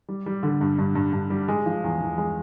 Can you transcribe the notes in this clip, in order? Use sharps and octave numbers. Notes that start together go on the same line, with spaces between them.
G3
G3
D3
G2
G2
G2
G2
G3
G#3
F3
E2
E2
G#3